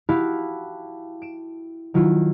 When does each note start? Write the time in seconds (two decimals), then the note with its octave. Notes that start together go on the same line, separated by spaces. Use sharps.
0.09 E4 F#4 G4 F5 A5 B5
1.22 D7 E7
1.94 D#3 F#3 E4 F4